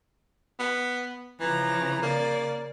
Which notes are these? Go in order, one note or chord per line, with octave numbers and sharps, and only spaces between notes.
B3
C#3 E3 F3 A#5
C#3 A#3 D5